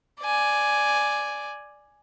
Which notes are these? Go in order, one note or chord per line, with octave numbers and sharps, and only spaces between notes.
D5 G#5